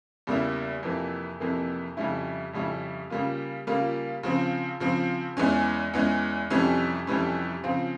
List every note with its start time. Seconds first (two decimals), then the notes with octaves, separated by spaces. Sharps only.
0.27 E2 C#3 G3 A#3 E4
0.83 F2 C3 E3 A#3
1.40 F2 C3 E3 A#3
1.97 F2 C#3 G3 C#4 E4
2.53 F2 C#3 G3 C#4 E4
3.10 C#3 G3 A#3 F4
3.67 C#3 G3 A#3 F4
4.23 C#3 F3 C4
4.80 C#3 F3 C4
5.37 E2 E3 G#3 C#4
5.94 E2 E3 G#3 C#4
6.50 F2 C3 E3 G3 C#4
7.07 F2 C3 E3 G3 C#4
7.64 C#3 F3 C4 F4